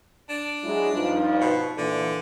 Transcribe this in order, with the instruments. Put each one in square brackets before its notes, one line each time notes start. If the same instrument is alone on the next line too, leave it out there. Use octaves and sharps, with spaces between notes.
[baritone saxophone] D4
[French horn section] F#3 G#3 E4
G2 F3 D#4
[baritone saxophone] B2
[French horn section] A#2 E3 [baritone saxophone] D3